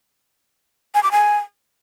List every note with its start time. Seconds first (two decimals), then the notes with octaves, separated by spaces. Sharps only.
0.95 G#5
1.03 D6
1.12 G#5